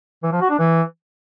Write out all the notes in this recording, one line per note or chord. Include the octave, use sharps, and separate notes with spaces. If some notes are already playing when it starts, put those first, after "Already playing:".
E3
F3
F#4
D4
E3